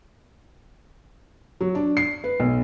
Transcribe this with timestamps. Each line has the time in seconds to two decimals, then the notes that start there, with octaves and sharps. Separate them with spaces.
1.61 F#3
1.75 D4
1.97 C7
2.24 B4
2.40 B1